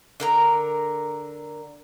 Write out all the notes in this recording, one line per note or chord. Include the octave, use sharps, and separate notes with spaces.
D3 A#4 A#5